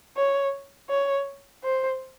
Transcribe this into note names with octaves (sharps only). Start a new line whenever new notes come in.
C#5
C#5
C5